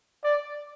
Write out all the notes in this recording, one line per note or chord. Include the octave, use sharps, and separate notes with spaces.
D5